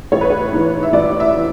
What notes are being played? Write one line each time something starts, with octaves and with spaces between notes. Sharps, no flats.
A1 C#5
B4
C#5
G#2 E3
E5
A1 D5
E5
E3